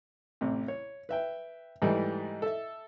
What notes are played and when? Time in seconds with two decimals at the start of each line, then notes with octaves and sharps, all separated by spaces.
0.41 A1 C3
0.68 C#5
1.09 B4 E5 G5
1.82 G#2 E3 G3 A3 E4
2.42 A4 E5